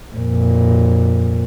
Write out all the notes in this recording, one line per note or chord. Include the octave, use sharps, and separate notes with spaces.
F2 A#2